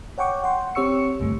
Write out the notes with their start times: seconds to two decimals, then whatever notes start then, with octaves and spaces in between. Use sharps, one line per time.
0.18 C#5 F#5 G5 C#6 D6
0.44 F#5 G5 C6
0.75 C4 G4 C#5 C#6 E6 C#7
1.20 A#1 G2 D3 A3